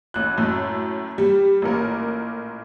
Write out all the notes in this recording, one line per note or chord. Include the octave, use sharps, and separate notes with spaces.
A1 F#6
F#2 A2
G3
A1 A#2 A#4